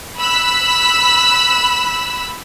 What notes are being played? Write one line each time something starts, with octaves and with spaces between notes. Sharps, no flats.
B5 E6 F#6 B6